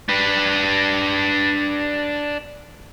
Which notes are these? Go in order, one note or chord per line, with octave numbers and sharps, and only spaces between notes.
D4 B4